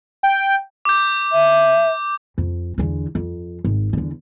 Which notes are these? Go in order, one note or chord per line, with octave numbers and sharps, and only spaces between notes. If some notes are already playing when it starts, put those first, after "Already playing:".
G5
D6 G6
E5
F2
E2 D3
F2
G#1
E2 D3